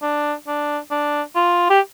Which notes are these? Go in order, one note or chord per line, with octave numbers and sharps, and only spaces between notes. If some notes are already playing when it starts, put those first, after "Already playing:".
D4
D4
D4
F4
G4